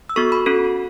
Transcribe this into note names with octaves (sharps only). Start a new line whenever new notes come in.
E6
B3 F#4 A4 C#6
B5
C#4 F#4 A4